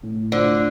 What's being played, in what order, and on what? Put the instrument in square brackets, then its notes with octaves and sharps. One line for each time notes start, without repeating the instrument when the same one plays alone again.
[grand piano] A2
[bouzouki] D3 [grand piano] A3 D4 F4 C5